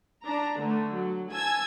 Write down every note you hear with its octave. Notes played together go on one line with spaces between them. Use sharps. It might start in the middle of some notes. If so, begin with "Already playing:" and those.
D4 A#5
D3 A3
F#3
G#5 A5 E6 G#6